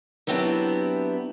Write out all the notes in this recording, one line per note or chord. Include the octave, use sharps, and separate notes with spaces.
F#3 B3 C4 D4 E4 G4